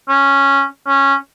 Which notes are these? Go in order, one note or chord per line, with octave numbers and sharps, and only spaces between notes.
C#4
C#4